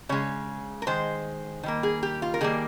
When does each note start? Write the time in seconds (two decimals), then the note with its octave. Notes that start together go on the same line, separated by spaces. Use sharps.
0.09 C#3 G#3 C#5
0.82 A#4
0.87 D#3 G#3 C5
1.63 D#3 G3 A#3
1.83 G#4
2.03 G4
2.22 F4
2.34 A#4
2.41 D#3 G3 A#3 G#4